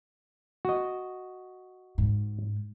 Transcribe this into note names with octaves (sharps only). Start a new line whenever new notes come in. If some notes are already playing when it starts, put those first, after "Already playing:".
F#4 D#5
G#2